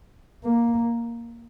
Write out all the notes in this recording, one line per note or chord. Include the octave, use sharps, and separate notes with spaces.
A#3